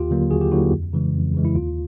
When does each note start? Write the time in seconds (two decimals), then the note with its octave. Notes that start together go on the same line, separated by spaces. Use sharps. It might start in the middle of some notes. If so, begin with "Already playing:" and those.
Already playing: D#2 F4 G4
0.11 D3 F#3 A#3
0.31 D#2 F#4 G#4
0.41 G4
0.52 D3 F#3 A#3 E4 F#4
0.72 F2
0.93 C#3 E3 G#3
1.15 F2
1.34 C#3 E3 G#3
1.45 E4
1.55 D#2 F4